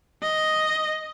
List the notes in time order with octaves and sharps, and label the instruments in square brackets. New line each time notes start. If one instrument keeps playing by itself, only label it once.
[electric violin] D#5